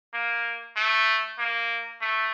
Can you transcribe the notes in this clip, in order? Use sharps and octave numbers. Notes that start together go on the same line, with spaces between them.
A#3
A3
A#3
A3